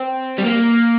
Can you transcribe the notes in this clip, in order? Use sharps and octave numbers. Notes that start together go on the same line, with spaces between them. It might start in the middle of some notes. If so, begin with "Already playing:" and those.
Already playing: C4
G3
A#3